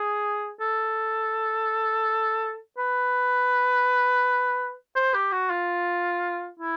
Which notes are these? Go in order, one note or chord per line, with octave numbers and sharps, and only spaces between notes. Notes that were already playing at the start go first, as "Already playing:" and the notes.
Already playing: G#4
A4
B4
C5
G4
F#4
F4
E4